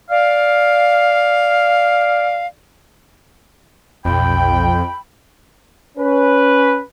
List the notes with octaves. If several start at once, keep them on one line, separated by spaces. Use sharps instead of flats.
D5 F5
F1 B1 F2 G5 B5
C#4 B4